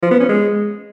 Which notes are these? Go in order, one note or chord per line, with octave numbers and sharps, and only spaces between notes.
F3
B3
C#4
G#3